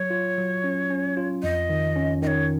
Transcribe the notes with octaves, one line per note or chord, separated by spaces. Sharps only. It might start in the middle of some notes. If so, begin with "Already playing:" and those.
Already playing: F#3 C#5
F4
F#3
C#4
C#4
F4
F2 D#5
D#3
C#4
D#3 C#5 D#5